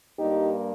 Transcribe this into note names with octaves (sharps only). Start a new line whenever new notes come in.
G2 G3 A#3 D#4 G4